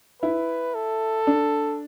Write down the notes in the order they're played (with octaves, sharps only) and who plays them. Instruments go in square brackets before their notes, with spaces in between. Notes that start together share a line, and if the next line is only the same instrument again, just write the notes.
[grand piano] E4 [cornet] B4
[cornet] A4
[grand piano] D4